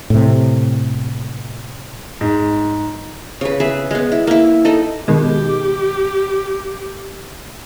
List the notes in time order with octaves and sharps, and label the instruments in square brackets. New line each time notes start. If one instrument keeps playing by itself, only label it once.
[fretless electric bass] A2 C3
[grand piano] G#2
[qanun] C#3 B4
G#4 B4 E5
G#3 B3
E4
A#3 E4
D#4 A4 D#5
[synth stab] B2 D#3 G#3 [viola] G4